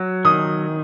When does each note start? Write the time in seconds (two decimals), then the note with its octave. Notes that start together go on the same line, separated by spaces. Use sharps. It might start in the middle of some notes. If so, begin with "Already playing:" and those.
Already playing: F#3
0.25 D#3 D#6